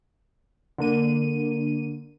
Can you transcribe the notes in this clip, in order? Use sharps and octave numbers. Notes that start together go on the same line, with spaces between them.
D3 A#3 D#7